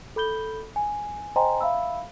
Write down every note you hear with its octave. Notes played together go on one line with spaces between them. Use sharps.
A4 B5 G6 G7
G#5
C5 D#5 G5 G#5 A#5 C6
E5 F5 B5 E6